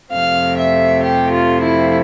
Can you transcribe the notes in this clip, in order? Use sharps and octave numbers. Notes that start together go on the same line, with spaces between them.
F2 C3 F3 A3 C4 F5
E5
G4
F4
E4